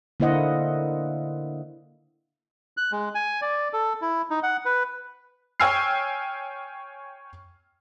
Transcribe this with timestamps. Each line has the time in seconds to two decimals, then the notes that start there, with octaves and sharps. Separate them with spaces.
0.20 D3 A#3 E4 C5 D#5 F#5
2.77 F#6
2.92 G#3
3.15 G#5
3.41 D5
3.73 A4
4.02 E4
4.30 D#4
4.43 F#5
4.65 B4
5.60 C#5 G5 G#5 E6 F6 C7